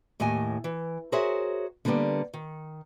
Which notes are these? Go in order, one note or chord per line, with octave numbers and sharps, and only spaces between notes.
D#2 A2 G4 D#5 G#5
E3
F#4 G#4 A#4 C5 C#5 E5
D3 G3 A#3 B3 G4
D#3